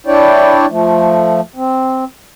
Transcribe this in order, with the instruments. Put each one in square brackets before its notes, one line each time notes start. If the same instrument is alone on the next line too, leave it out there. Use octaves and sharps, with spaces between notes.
[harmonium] D4 E4 C#5 D5 G5
F3 A3
C4